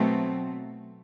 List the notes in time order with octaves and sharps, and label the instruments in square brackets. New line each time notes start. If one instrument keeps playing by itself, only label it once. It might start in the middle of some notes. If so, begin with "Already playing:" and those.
Already playing: [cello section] B2 F#3 A3 C4